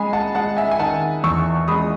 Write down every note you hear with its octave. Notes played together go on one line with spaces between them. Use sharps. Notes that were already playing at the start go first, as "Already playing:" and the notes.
Already playing: G#3 G#5 B5
F#5 A5
G#3 F#5 A5
E5 G#5
G#5
D#3 F#5 A5
E2 C#6 E6
G#3 B5 D#6